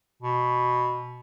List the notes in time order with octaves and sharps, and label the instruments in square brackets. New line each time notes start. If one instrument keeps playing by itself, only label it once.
[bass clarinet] B2